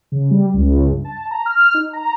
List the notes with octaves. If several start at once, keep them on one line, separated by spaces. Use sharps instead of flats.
C#3
G3
C#2
G2
A5
A#5
F6
D#4
A#5